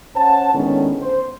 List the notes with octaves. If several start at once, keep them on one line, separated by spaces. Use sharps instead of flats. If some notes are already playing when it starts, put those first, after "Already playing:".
C#4 C5 F#5 A5
A2 D3 D#3 G#3 B3 C#4
C5